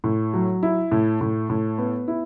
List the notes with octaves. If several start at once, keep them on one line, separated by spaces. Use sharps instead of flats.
A2
F#3
E4
A2
A2
A2
B3
E4